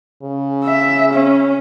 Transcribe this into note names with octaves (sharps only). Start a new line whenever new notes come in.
C#3
E5
C#4